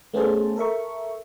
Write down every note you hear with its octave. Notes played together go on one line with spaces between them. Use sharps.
A3 B3 C#4 G#4 C5 A5
A4 A#4 E5 C#6